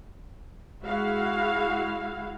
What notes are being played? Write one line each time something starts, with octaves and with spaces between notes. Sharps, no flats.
G#3 E4 F#4 F5